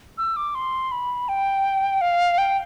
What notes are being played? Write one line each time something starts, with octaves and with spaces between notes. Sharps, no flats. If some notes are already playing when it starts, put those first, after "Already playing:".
E6
D6
C6
B5
G5
F5
G5